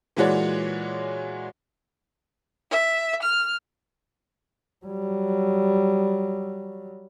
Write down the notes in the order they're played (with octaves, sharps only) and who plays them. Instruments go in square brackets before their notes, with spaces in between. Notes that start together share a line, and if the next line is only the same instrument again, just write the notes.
[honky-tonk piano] A#2 E3 G#3 F#4 C#5 D5
[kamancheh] E5
F6
[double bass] F#3 G3